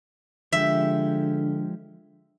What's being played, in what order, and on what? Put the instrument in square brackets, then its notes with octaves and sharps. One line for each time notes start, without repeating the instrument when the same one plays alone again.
[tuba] D3 [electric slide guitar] F3 G#3 G4 [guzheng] E5